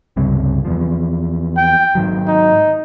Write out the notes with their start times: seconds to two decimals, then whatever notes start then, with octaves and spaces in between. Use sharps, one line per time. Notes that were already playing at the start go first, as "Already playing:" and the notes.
0.17 C#2 G2 C3
0.65 E2 F3
1.57 G5
1.95 G#2 D#3 F#3
2.27 D#4